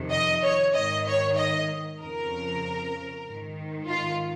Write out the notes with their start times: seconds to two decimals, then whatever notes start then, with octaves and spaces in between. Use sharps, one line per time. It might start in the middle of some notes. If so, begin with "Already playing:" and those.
Already playing: F2 C3 D#3
0.11 D#5
0.43 C#5
0.74 G#2 D#3 D#5
1.06 C#5
1.37 D#5
2.00 F2 C#3 A#4
3.26 G#2 D#3
3.90 F4